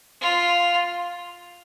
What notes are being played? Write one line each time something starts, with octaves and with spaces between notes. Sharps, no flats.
F4